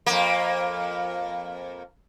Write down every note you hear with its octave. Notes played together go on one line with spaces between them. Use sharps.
F2 A#3